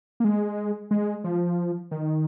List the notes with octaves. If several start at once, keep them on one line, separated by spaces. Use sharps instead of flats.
A#3
G#3
G#3
F3
D#3